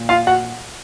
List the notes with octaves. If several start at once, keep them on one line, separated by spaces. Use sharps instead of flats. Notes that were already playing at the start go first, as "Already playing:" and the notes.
Already playing: A#2
F4 F5
F#4 F#5